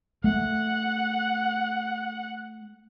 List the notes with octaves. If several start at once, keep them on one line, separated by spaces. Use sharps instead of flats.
A3 F#5